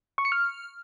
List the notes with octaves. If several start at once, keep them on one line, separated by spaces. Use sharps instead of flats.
C#6
C#7
F6